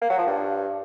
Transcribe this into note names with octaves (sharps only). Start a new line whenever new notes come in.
A#3
F#3
F3
G2